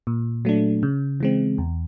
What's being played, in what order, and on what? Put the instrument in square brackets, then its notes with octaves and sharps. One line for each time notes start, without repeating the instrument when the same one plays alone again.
[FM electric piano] A#2
F#3 A3 D4
C#3
E3 G#3 C4
E2